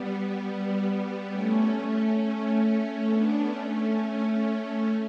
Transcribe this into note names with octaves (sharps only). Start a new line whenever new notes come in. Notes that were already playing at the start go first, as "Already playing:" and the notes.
Already playing: G3 B3
A3 C#4
A3 C#4
B3 D4
A3 C#4
A3 C#4